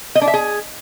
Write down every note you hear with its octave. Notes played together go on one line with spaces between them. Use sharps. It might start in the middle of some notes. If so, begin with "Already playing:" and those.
D#5
D4
E5
G#4